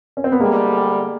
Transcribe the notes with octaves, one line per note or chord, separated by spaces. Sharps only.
C#4
C4
B3
D2 D3 G3 G#3 A#3